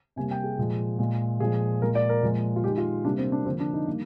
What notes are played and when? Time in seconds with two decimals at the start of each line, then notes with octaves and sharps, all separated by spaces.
0.16 C3 G3 A#3 G#5
0.31 G5
0.44 G#4
0.58 A#2 F3 G#3
0.99 A#2 G#3
1.40 A#2 F3 G#3 G#4
1.82 A#2 G#3 A#4
1.95 D5
2.09 A#4
2.23 A#2 F3 G#3
2.56 F4
2.64 G#3 G4
2.67 D#3
2.78 F4
3.04 C3 G3 A#3 D4
3.18 C4
3.32 D4
3.45 D3 F3 A#3 C4
3.60 D4
3.73 D#4
3.87 D#3 G3 A#3